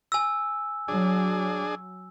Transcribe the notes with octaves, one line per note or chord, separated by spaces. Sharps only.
G#5 E6
F#3 D4 G#4